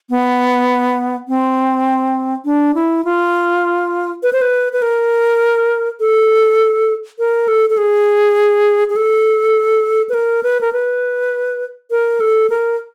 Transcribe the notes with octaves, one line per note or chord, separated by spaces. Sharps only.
B3
C4
D4
E4
F4
B4
C5
B4
B4
A#4
A4
A#4
A4
A4
G#4
G#4
A4
B4
A#4
B4
A#4
B4
A#4
A4
A#4